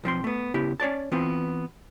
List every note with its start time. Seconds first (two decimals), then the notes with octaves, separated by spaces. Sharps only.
0.04 B1 F3 C4 C6
0.24 A3 B3
0.54 C#3 B3 E4 G4
0.80 C#4 C#5 D5 A5
1.12 E3 B3 C4 F4